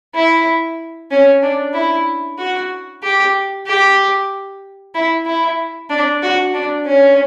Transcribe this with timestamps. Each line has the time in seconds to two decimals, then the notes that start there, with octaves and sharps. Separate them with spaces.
0.15 E4
1.11 C#4
1.43 D4
1.74 E4
2.39 F#4
3.03 G4
3.67 G4
4.95 E4
5.26 E4
5.90 D4
6.23 F#4
6.54 D4
6.86 C#4